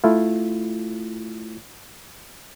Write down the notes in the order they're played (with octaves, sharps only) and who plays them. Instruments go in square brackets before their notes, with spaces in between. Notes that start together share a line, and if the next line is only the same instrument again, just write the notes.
[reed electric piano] A3 E4 F4